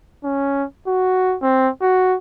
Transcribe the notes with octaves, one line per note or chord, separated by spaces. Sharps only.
C#4
F#4
C4
F#4